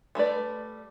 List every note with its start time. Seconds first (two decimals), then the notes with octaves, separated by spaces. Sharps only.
0.15 G3 A3 B4 D5